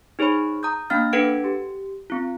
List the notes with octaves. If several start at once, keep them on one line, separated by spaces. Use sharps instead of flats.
D#4 G#4 C5 C#5 B5
A#5 D#6 G6
A#3 D4 F5 F6 A6
D4 A4 B4 F#5 G#6 D7
G4
C4 F4